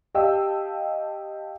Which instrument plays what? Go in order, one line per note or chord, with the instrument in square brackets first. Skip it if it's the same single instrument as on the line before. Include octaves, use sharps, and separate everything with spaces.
[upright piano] G4 D#5 F5 G5 A5 E6